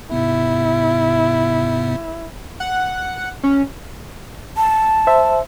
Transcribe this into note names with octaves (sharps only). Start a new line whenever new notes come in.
G#2 C3 B3 E4
F#5
C#4
A5
C5 E5